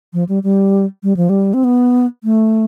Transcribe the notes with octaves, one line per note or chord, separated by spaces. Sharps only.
F3
G3
G3
G3
F3
G3
C4
B3
A3